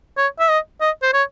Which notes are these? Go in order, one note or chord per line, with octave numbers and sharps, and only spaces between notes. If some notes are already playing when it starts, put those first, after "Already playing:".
C#5
E5
D#5
D#5
C5
C#5